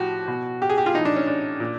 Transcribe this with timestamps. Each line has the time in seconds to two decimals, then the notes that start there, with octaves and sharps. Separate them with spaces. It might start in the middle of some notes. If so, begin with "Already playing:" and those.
Already playing: A2 F3 F#4 G4
0.28 B2
0.62 G4
0.70 G#4
0.78 G4
0.86 F4
0.94 A2 E3 D#4
1.05 D4
1.16 C#4
1.27 D4
1.60 A#2